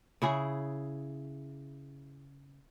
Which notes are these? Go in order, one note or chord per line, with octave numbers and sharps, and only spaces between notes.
C#3 E4 G#4